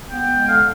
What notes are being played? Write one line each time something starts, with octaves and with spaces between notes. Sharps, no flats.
B3 G5
G#3
D3 F5